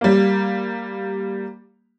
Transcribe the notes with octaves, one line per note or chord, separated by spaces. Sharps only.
G3 A#3